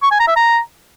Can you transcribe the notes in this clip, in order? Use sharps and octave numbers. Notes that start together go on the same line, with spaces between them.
C#6
G#5
A#5
E5
A#5